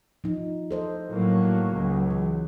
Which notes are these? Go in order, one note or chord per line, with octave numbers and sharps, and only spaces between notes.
F3 D#4
A4 C5 D#5
A2 F#3 A#3
C#2 F#3
E3